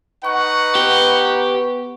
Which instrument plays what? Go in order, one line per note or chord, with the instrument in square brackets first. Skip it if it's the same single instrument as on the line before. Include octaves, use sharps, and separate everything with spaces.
[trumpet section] D#4 B4 F#5 [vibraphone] C#6
[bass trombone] B3 [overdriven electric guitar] G4